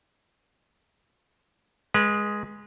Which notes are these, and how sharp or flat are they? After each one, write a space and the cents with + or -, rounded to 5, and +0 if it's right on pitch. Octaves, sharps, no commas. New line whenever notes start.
G#3 +0 B4 -30